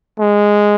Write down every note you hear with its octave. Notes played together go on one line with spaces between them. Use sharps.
G#3